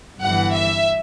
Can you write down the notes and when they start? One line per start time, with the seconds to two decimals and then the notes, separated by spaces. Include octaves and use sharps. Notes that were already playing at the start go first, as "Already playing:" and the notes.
0.20 G1 G2 E3 F#5
0.52 E5